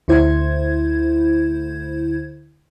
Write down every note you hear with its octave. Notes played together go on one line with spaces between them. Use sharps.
D2 D3 E4 C5 G#6